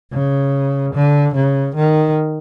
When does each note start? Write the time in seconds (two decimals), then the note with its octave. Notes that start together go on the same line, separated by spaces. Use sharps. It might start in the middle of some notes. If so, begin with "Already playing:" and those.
0.12 C#3
0.94 D3
1.35 C#3
1.76 D#3